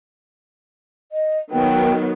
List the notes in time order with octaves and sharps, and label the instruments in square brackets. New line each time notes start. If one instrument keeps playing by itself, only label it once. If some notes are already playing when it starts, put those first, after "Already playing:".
[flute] D#5
[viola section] D#3 F#3 B3 [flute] G5